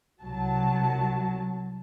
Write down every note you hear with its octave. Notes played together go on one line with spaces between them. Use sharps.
C2 F#3 A5